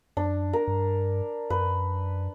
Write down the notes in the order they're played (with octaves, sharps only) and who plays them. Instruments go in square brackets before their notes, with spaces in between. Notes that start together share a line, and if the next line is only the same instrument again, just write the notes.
[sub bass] F#2 [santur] D4
[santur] A#4
[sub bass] G2
[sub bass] F#2 [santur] B4